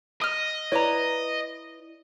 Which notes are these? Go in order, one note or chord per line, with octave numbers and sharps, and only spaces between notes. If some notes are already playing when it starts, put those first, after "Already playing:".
D#5 D#6 F6
E4 B4 C#5 D5 A#5